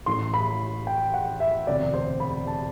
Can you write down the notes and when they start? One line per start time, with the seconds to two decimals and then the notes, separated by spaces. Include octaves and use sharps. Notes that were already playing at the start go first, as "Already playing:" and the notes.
0.06 A1 A2 E3 C6
0.34 B5
0.87 G5
1.14 F#5
1.40 E5
1.67 E1 D2 C3 D5
1.94 C5
2.20 B5
2.47 A5